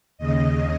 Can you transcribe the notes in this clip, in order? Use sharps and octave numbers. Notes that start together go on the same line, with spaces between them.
D#2 C#3 D#5